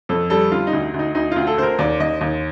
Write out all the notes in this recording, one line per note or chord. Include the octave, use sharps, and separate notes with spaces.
F2 A4
G3 A4
D3 F4
D#4
D2
D2
D#4
D2 D#4
D2 F4
A4
D2 C5
A#4
D#2 D5
D#2 D#5
D#2